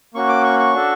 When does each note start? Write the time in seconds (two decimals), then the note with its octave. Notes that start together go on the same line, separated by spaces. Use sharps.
0.14 A#3 C#4 F#4 C#6
0.29 D6
0.44 C#6
0.59 C#6
0.73 D4 F#4 A4